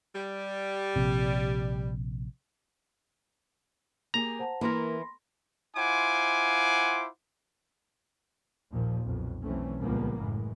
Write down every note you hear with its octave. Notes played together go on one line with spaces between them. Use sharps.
G3
A#1 C3
A#3 G4 G#4 A#5
C5 F#5 A5
E3 A#3 E4 A#4 B5 C6 A#6
E4 F4 C5 F#5 G#5 D6
A#1 D#2 A#2 F3
B1 F2
B1 E3 A3 C4 C#4
C#2 A#2 F3 G3 A#3 B3
F#1 A2 E3 G#3